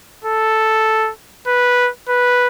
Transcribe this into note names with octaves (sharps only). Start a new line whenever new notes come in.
A4
B4
B4